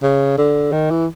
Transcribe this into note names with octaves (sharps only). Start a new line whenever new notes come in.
C#3
D3
D#3
E3